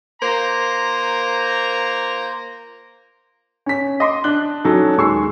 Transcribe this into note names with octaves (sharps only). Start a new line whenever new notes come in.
A#3 F4 C5 A#5
C#4 B6
D#5 C6 D6
D4 F#6 G7
F#3 C#4 D#4 A4
D#1 D#3 G#3 C#6 E6 C7